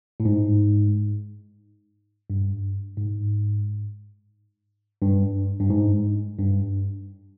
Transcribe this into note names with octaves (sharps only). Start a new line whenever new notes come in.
A2
G#2
G2
G#2
G2
G2
G#2
G2